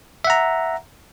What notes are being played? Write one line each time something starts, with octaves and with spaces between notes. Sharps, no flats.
E5 F#5 A#5